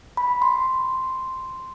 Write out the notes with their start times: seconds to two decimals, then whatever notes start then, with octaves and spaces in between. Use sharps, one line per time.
0.17 B5
0.42 C6